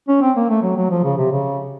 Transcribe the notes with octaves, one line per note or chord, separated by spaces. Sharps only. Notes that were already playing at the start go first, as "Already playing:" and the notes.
C#4
C4
A#3
A3
F#3
F#3
F3
C#3
C3
C#3